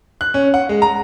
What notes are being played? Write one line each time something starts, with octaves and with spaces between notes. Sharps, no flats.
F#6
C#4
F#5
G#3
A#5